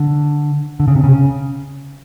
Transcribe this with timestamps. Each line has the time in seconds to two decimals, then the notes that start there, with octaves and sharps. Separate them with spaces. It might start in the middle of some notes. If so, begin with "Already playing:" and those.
Already playing: D3
0.80 D3
0.88 C#3
0.96 C3
1.04 C#3